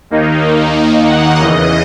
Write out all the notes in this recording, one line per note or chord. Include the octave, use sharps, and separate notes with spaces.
D#2 D#3 A#3 D#4
F#5
E2 C#3 E3 D#5